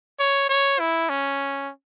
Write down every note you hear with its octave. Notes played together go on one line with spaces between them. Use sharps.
C#5
C#5
E4
C#4